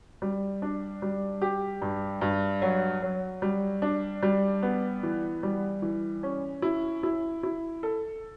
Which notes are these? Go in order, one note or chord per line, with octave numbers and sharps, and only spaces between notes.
G3
D4
G3
G4
G2
G2
F#3
F#3
G3
D4
G3
B3
E3
G3
E3
C#4
E4
E4
E4
A4